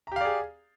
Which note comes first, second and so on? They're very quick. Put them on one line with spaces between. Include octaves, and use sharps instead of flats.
A#5 G4 F5 D5 G#4